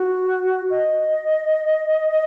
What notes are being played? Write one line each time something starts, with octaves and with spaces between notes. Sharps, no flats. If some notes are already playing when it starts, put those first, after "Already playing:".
Already playing: F#4
D#5